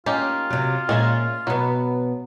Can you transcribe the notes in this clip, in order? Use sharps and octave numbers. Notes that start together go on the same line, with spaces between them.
A#3 C#4 D#4 F4 G4
C3 F#3
A#2 G#3 C#4 E5
B2 F#3 B3